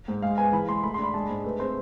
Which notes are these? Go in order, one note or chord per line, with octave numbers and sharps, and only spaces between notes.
G#2
G#3 F5
B3 G#5
E3 B5
G#3 C6
A3 B5
D4 C6
B5
G#3 A5
G#2
A3 B4
C4 C5